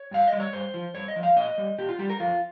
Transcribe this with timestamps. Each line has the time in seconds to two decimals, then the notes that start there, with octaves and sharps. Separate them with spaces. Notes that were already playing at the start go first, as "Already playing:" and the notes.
Already playing: C#5
0.11 G2 F5
0.28 G3 D#5
0.40 C#5
0.53 G2 C5
0.74 F3
0.94 G2 C#5
1.08 D#5
1.16 F3
1.23 F5
1.36 A#2 D#5
1.58 G3
1.78 A#2 G4
1.89 F4
1.99 G3 G4
2.10 A#4
2.20 F2 F4